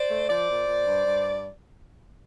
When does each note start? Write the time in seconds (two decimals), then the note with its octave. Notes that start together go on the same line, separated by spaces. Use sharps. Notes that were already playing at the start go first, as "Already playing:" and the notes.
Already playing: C5 D5
0.10 A3
0.29 F3 C5 D5
0.48 A#2
0.67 A#2
0.86 G2
1.05 G2